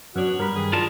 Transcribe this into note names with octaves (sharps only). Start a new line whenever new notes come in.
F#2 B3 D4 F#4 C#5
G2 A#4 B5
D#3 G#4
G3 F4 A#4 A5